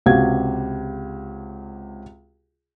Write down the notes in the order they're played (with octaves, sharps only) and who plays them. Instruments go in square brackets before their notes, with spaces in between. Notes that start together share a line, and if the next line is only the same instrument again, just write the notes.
[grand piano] C#2 C3 F#4 G4 G#6